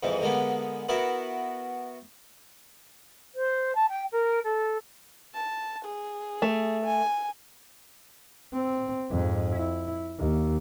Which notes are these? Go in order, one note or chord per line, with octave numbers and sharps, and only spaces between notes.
F2 G#2 E3
D3 G#3 A#3 B3
B3 E4 F#4 A#4
C5
A5
G5
A#4
A4
A5
G#4
A3
G#5
C4
F2 G#2
E4
D#2